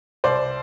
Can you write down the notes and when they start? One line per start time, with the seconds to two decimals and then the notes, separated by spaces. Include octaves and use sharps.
0.24 C2 C5 D5